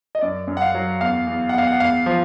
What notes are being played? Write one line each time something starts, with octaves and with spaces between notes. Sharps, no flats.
D#5
F#2 D5
F#2
F#5
F5
F#3
E2 F5
E2
F#5
E2 F5
F#5
E2 F5
F3